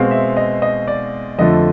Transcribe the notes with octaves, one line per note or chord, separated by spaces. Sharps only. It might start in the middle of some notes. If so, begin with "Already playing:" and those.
Already playing: B2 G#3 C4 F5
E5
D#5
D#5
D5
F2 D3 F3 A3 D#5